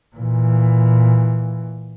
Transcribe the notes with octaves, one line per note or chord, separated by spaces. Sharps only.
A#2 E3